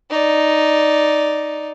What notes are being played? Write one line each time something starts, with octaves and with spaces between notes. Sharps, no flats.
D#4 D5